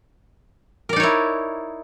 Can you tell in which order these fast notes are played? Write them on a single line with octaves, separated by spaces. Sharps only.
A#4 D5 D#4 C#5 E4